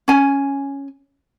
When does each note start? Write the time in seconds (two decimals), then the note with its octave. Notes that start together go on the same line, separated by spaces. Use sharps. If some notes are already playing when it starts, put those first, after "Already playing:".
0.08 C#4 G#5